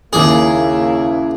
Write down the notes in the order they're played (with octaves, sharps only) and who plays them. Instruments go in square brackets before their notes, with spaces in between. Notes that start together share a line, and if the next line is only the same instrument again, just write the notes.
[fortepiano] D#2 D6 [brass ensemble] C#3 A#3 E4 [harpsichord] G#4